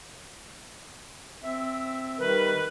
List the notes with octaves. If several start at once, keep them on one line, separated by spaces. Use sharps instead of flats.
C4 E5
D#3 G3 A#4 B4